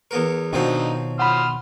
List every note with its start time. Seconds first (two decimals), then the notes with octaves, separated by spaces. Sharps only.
0.11 E2 B3 A#4
0.53 B2 D3 D#3 F3 F#3 C4 D#4
1.19 F#5 B5 C6 D#6 F6